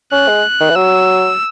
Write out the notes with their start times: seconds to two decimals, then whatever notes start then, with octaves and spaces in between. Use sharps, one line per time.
0.12 C#4 F#6
0.28 G#3
0.61 D#3
0.70 E3
0.76 F#3 E6